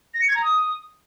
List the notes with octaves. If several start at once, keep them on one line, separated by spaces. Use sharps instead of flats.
A#6
C#7
G#6
A#5
D#6